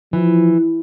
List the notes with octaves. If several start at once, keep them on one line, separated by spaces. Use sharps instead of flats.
E3 F3